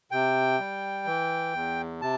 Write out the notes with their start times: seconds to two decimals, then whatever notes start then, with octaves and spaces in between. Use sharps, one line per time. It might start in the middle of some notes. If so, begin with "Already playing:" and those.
0.11 C3 G5
0.60 G3
1.06 E3
1.54 E2
2.01 C3 A5